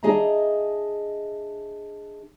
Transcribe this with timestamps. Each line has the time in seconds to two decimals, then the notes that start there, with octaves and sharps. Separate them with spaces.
0.03 D4 G#4 D#5 E5 A#5